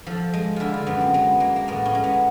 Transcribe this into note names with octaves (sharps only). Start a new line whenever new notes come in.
F3 A4
G#3
D3 E4 F4
F4
F#2 B3
C4
G#3 B3
G#3 A#3
A#3
A2 B3
C#4
G#3
B3